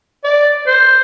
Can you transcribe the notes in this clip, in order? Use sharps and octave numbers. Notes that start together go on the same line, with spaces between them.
D5
C5